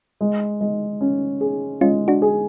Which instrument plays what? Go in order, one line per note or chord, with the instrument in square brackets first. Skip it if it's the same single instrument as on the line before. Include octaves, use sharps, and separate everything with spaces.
[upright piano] G#3
G#3
C#4
G#4
[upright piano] G#3 [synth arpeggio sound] C#4 F4
[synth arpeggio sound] D4 F#4
[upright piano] G#4